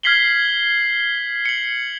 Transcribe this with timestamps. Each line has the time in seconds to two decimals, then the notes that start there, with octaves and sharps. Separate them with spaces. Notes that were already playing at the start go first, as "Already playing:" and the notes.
0.03 F6 G#6 B6 C7 F#7 G7
1.45 C#7 F#7